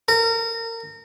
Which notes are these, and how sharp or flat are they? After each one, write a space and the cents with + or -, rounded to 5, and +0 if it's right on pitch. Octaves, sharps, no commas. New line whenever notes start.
A#4 -30